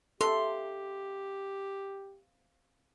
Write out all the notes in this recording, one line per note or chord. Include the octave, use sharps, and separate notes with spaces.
C4 G4 A4 E5 F5 C6